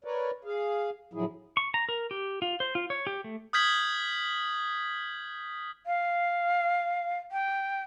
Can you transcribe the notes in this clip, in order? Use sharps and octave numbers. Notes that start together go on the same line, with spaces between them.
A#4 B4 C#5 D5
G#4 F5
A2 D3 F3 F#3 E4 G#4
C#6
A#5
A#4
G4
F4
C5
F4
C#5
G4
A3
D#6 F6 G6 G#6 B6 F#7
F5
G5